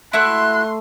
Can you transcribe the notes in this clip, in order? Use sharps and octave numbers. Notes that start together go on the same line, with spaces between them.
A3 E4 F#4 E5 C6 F#6